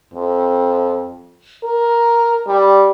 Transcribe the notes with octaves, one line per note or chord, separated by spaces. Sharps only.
F2
A#4
G3